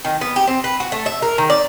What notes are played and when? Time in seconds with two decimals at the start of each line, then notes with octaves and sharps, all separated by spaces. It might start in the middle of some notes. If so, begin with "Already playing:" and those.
0.05 D#3
0.21 B3
0.36 G4
0.47 C4
0.64 B4
0.80 F#4
0.92 A3
1.06 E5
1.22 A#4
1.38 D#3
1.50 D5